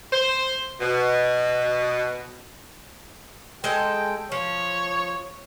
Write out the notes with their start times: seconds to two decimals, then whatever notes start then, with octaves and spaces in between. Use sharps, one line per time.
0.12 C5
0.80 B2
3.64 G#3 A4 D#5 G5
4.32 F3 C#5